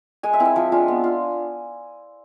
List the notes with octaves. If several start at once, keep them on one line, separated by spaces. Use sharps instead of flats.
G#3 G#5
E5
C4 E4
E5
F3
G#3 D4 F4
B3
F4